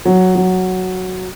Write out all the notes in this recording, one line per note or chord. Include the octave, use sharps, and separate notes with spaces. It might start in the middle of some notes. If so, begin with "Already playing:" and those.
F#3
F#3